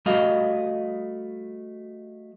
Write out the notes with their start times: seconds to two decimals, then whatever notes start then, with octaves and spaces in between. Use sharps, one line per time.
0.06 G3 A3 F#4 D#5 F5